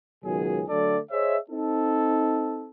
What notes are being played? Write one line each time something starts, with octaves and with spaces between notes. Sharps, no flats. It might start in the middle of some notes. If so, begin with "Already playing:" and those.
C#2 B2 D#3 F#3 G#4
D3 F#3 A3 D4 A4 D5
G#4 C5 C#5 D#5 E5
C4 D#4 A4